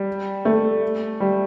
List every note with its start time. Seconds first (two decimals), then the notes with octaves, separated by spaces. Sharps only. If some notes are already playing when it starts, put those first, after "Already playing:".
Already playing: G3
0.45 A3
1.20 G3